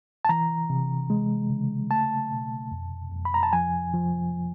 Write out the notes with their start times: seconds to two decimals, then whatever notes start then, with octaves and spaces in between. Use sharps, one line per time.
0.25 A5
0.29 E3 A#5
0.70 C3
1.10 G#3
1.50 C#3
1.90 A3 A5
2.32 B2
2.72 F2
3.12 F2
3.25 B5
3.34 A#5
3.43 A5
3.53 F3 G#5
3.94 F3